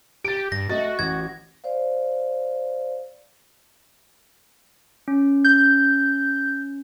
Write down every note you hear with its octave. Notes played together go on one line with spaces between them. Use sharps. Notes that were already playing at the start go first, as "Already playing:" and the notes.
G4 A6 D7
G2 A#6
A3 F#4 D#5 A6
A1 G#6
C5 D5 F5
C#4
G6